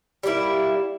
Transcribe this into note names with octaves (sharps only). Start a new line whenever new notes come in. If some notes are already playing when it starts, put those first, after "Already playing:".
G3 A#3 E4